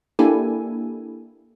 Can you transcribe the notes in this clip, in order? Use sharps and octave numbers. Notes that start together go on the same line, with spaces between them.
A#3 D4 E4 G4 A4 G#5